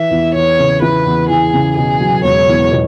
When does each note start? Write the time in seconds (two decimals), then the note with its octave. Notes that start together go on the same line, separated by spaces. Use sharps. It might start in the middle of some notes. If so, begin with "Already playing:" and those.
Already playing: E3 E5
0.11 E2
0.35 E2 C#5
0.59 C#3
0.82 E3 B4
1.06 E2
1.29 E2 G#4
1.53 C#3
1.77 B2 G#4
2.01 F#3
2.24 E1 C#5
2.48 E2
2.71 B2